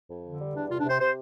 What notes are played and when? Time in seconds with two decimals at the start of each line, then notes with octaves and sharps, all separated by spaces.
0.10 F2
0.24 D3
0.40 G3
0.54 E2 D4
0.70 C3 F4
0.80 D4
0.85 C3
0.90 C5
1.00 C3 C5